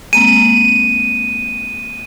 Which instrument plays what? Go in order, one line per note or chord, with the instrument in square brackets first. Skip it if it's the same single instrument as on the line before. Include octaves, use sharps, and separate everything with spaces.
[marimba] G#3 A#3 C4 [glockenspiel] D#7